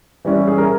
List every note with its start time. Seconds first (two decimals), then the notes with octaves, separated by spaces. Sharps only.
0.25 E3 G3 C#4 E4
0.48 G#4
0.58 A#4